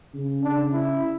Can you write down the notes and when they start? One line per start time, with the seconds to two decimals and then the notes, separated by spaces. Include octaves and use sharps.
0.14 C#3
0.44 C#3 D4
0.73 E4